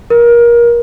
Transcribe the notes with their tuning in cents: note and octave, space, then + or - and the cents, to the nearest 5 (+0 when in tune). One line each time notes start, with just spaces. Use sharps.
A#4 +25